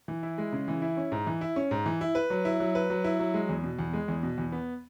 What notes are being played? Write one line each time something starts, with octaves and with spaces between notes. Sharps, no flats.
E3
E4
G#3
C#3
E3
E4
C#4
G#2
E3
E4
C#4
G#2
E3
E4
B4
F#3
E4
F#3
B4
F#3
E4
F#3
G#3
E2
B2
E2
G#3
E2
B2
E2
B3